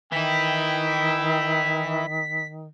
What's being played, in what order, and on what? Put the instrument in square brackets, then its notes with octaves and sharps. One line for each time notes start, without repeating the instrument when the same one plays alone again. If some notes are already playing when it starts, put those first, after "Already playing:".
[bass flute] D#3 [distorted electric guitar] E3 E4 [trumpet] G5 [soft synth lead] B6